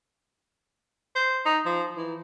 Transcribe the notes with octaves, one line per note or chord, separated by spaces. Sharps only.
C5
D#4
F3
E3